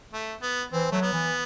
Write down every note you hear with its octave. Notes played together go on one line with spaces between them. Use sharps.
A3
B3
E3 C4
F#3 A3
B3
E3